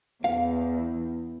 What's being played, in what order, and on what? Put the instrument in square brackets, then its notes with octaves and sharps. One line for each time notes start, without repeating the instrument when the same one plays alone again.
[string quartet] E2 [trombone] E3 [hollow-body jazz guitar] F5